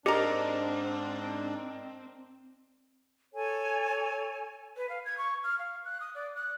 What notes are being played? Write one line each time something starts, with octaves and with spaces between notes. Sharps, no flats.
G#2 C4 D4 G4 A#4 D5 D#5 A#5
A4 C#5 G#5
B4
F5
G#6
C#6
F6
F5
F#6
D#6
D5
F#6